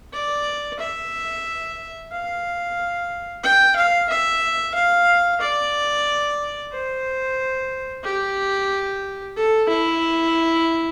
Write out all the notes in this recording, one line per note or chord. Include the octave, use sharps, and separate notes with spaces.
D5
E5
F5
G5
F5
E5
F5
D5
C5
G4
A4
E4